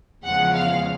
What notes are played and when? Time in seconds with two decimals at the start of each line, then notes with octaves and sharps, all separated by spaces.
0.24 E2 C#3 F3 G#3 F#5
0.54 F5